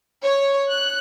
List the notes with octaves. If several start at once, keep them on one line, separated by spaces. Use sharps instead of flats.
C#5
F#6